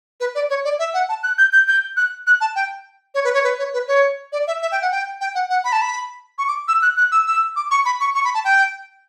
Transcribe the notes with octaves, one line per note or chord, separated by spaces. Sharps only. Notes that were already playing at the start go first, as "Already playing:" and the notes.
B4
D5
C#5
D5
E5
F#5
A5
F#6
G6
G6
G6
F#6
F#6
A5
G5
C#5
B4
C#5
B4
C#5
B4
C#5
D5
E5
E5
G5
F#5
G5
G5
F#5
F#5
B5
A5
B5
C#6
D6
E6
F#6
F#6
E6
E6
D6
C#6
B5
C#6
C#6
B5
A5
G5